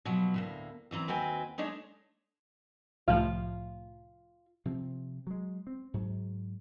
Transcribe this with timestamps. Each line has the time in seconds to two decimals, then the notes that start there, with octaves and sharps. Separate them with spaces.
0.05 B2 F3 F#3
0.34 D2 A2 A#3
0.91 D2 E3 C4 A#5
1.08 D#2 C4 F#4 B4 G5 G#5
1.58 G#3 A3 D4 D#4 C#5
3.08 C2 A2 F3 F4
4.65 C3 F3 C4
5.27 F#3 G#3
5.67 C4
5.94 G#2 F#3